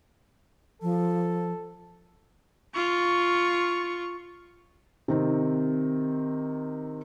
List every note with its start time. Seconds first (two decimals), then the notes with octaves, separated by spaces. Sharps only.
0.82 F3 A4
2.74 F4 C#6
5.08 C3 D#3 C4